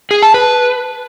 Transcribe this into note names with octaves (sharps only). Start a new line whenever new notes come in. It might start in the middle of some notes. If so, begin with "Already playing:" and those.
G#4
A5
B4